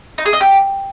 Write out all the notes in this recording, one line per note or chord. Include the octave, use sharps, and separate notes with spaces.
D#4
G#4
D#5
G4